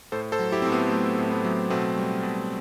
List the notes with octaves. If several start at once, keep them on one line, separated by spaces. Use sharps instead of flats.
A2 A4 C5
A4 C5
F#3
E4 G4
A2 C4
B3
F#3 A3
A2
B3
F#3
B2 A3 C4
G3
B2